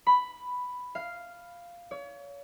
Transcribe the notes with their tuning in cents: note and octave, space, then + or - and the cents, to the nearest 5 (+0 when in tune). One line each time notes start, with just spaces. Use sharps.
B5 +5
F5 -5
C#5 +35